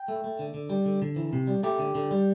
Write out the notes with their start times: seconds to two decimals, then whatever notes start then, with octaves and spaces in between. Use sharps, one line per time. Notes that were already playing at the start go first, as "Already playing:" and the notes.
Already playing: G5
0.08 A3
0.24 A3
0.39 D3
0.54 D3
0.70 G3
0.85 D3
1.02 D3
1.16 E3
1.33 C3
1.47 G3
1.63 A3 G4
1.79 D3
1.95 D3
2.11 G3